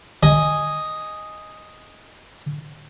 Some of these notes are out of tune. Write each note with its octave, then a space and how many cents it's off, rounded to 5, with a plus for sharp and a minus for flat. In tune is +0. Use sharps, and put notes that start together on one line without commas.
D#5 +0 G#5 +0